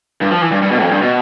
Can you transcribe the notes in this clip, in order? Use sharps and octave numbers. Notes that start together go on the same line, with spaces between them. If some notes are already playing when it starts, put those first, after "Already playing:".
G2
F3
E3
G2
G2
B2
F2
G2
B2